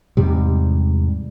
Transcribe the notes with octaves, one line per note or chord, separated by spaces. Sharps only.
E2 G#2 C3 G3